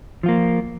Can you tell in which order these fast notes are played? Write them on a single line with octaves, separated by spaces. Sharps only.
F3 F4 A#3